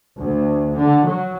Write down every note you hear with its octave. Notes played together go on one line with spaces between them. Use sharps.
D2
D3
F#3